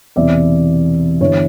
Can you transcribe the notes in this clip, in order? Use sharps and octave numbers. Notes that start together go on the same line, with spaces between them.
E1 E2 C3 E3 D5 E5
G1 G2 E3 C#5